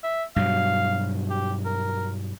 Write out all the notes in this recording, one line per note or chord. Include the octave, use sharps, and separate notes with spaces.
E5
G2 B2 F#3 F5
G4
A#4